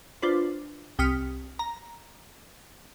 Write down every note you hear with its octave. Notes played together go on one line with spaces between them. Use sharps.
D4 F4 B4 C5
C2 G5 D#6 F6 B6 C#7
A#5